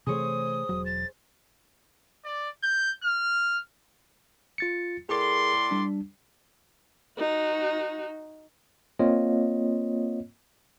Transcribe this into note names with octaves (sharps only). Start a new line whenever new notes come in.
C3 E3 A3 G#4 C5 C#5 D#6
E1 F#3
A6
D5
G6
F6
F4 A6 C#7
A2 G#4 A#4 D5 C6
G3 D4
D#4 F#4
A#3 C4 F4 C#5 D#5